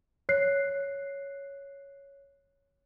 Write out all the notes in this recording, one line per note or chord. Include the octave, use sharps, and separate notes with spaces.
C#5 F#6 C7